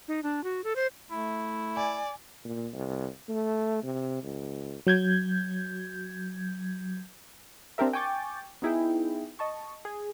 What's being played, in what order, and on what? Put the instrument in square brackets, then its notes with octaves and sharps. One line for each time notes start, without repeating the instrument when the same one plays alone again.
[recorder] D#4
D4
F#4
A4
C5
[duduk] A3 [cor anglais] E4
[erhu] D5 [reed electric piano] G#5
[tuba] A#2
C2
A3
C3
C#2
[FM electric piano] F#3 G6 G#6
[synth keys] C4 D4 G4 A#4 E5
G5 G#5 C#6 D6 G6 A6
B3 D#4 E4 G#4 G5
D#5 A5 C#6
G#4